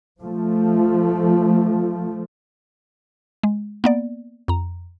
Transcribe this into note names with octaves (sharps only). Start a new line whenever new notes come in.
F3 A3
G#3
A#3 B3 D5
F2 A#5